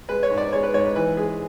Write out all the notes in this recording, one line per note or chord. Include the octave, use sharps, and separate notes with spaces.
G#3 B4
C#5
G#2
D5
G#3 C#5
B4
G#2 C#5
B4
E3 B4
G#3 G#4